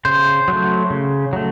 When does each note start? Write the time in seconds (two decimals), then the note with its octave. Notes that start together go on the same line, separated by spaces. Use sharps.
0.05 C#3 C5
0.48 F#3 A3
0.90 C#3
1.33 F#3 A3